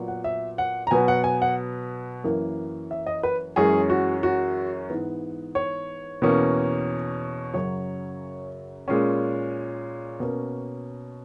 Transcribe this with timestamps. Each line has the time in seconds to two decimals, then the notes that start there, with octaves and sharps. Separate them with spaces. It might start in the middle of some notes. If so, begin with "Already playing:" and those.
Already playing: A#2 F#3 B3
0.08 F#5
0.24 E5
0.58 F#5
0.87 A#5
0.91 B2 F#3 B3 G#5
1.08 F#5
1.24 G#5
1.42 F#5
2.24 F#2 E3 A#3
2.91 E5
3.06 D#5
3.23 B4
3.56 F#2 E3 G#3 C#4 G#4
3.90 F#4
4.23 F#4
4.90 G#2 E3 B3
5.55 C#5
6.22 E2 B2 A#3 C#4
7.54 F#2 C#3 F#3 C#5
8.88 A#2 G#3 C#4
10.20 B2 A#3 C#4